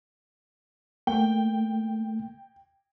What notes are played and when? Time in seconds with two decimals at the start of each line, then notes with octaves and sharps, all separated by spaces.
1.07 A3 A#3 G5